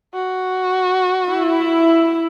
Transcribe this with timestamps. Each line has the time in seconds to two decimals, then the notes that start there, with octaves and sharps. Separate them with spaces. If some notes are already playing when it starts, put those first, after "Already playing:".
0.14 F#4
1.28 E4